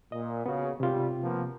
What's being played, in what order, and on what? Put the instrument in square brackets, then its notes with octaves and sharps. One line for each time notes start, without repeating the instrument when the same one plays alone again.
[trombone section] A#2 [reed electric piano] D#5
[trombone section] C#3 [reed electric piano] B3 F#4
[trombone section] G#1 G3 [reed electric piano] C3 F4
[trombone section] F3 A#3 B3